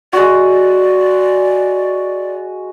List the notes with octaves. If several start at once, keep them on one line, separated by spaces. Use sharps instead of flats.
G#3 F#4 D5